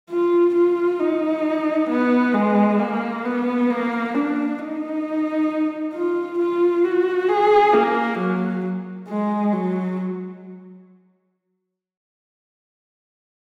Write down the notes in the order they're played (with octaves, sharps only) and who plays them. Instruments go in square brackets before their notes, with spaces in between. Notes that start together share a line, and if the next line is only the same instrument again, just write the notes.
[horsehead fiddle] F4
F4
D#4
B3
G#3
A#3
B3
A#3
D4
D#4
F4
F4
F#4
G#4
A#3
F#3
G#3
F#3